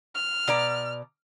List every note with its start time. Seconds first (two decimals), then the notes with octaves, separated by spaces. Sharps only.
0.15 F6
0.47 B2 D5 A#5